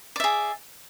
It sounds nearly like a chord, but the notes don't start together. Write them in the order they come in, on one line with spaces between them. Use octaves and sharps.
D5 E5 G#4